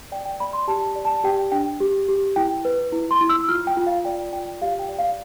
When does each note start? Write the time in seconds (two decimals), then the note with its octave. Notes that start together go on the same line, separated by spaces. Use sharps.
0.12 D5 G5
0.25 G5
0.40 D5 B5
0.53 C6
0.68 G4 A5
0.96 D5
1.05 A5
1.24 G4 G5
1.52 D4 G5
1.80 G4
2.08 G4
2.36 E4 G5
2.65 B4
2.92 E4
3.11 C6
3.21 E4
3.29 E6
3.49 F4 F6
3.67 G5
3.77 F4
3.86 F5
4.05 D5 G5
4.33 F4 G5
4.62 G4 F5
4.79 G5
4.89 D5
4.99 F5